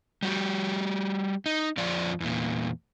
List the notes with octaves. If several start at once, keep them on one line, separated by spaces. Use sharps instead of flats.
G3 F#4 G4
D#4
F2 F3 F4 D5
E2 A#2